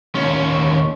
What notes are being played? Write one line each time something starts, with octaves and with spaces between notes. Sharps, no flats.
D#2 C#4